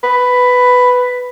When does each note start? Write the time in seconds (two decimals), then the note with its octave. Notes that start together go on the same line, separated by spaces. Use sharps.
0.03 B4